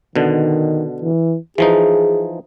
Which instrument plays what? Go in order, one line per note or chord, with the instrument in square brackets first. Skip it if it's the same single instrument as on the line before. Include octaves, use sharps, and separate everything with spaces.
[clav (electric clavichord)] B2 D3 [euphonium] D#3
[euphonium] E3
[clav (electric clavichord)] E3 F3 D#4 [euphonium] G#4